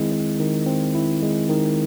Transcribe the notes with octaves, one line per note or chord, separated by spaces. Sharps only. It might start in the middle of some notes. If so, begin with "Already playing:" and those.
Already playing: D#3 G#3 C4 E4
G#3
D#3
C4
E4
G#3
D#3